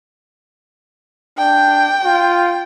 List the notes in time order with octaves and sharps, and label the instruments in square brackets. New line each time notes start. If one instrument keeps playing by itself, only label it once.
[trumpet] D4 [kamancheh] G5
[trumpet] F4